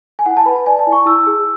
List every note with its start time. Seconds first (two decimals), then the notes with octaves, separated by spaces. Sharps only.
0.19 G#5
0.26 E4 F#5
0.37 A5
0.46 B4 B5
0.56 A5
0.66 D5 G#5
0.79 A5
0.87 E4
0.92 C#6
1.06 E4 E6
1.27 G#4